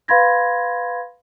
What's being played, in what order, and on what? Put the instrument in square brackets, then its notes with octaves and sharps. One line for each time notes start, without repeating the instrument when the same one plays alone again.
[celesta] B4 F5 B5 C6 G#6 A#6